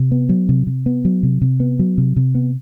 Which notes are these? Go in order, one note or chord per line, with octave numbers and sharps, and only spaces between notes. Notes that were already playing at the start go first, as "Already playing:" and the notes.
Already playing: C3
B3
F#3
C3
C3
B3
F#3
C3
C3
B3
F#3
C3
C3
B3